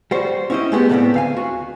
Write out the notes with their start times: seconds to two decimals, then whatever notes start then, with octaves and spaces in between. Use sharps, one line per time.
0.11 G3 F#4 C5
0.50 C#4 E4 F#4 C5 D#5
0.72 G#3 A3 B3 G4
0.89 C#2 A2 C#3 G3 B3 C4
1.14 D2 F5 G#5
1.37 F#4